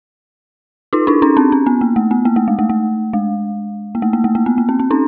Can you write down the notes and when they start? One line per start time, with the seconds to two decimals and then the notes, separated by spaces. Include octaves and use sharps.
0.93 D#4 F4
1.07 D4 E4
1.22 C#4 D#4
1.37 C4 D4
1.52 C#4
1.67 B3
1.81 A#3
1.96 A3
2.11 B3
2.25 A#3
2.36 A3
2.48 G#3
2.59 A3
2.70 A3
3.13 G#3
3.95 A#3
4.02 A3
4.13 A#3
4.24 A3
4.35 A#3
4.46 B3
4.58 A#3
4.69 C4
4.80 C4
4.91 C#4 D#4